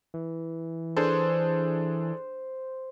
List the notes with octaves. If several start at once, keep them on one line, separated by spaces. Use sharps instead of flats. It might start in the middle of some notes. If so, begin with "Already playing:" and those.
E3
D4 G#4 A4 C5